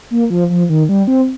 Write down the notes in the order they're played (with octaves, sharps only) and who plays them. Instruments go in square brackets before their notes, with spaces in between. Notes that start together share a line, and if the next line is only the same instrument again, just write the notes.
[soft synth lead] A#3
F3
F3
D#3
G3
C4